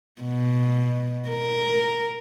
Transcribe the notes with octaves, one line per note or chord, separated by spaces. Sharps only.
B2
A#4